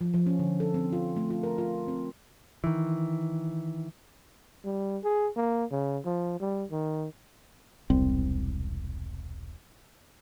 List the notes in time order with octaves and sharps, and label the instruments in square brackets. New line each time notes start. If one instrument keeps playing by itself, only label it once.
[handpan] F3
F3
C#4
D3
A4
C4
F4
A3
F4
A#4
F4
C4
[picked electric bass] D#3 E3
[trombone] G3
G#4
A#3
C#3
F3
G3
D#3
[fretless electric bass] E1 C2 G3 C4